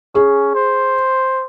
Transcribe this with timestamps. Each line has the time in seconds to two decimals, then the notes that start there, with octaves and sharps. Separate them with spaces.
0.15 C#4 G#4
0.55 C5